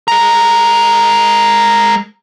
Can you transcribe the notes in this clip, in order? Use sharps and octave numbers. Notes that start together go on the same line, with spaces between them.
G#3 A#4